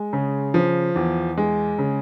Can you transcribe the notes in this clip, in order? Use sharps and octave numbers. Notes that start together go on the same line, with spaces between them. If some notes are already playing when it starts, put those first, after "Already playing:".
Already playing: G#3
C#3
F3
E2
G#3
C#3